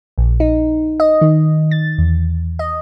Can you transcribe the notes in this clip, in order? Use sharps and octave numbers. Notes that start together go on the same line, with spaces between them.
A#1
D#4
D#5
D#3
A6
E2
D#5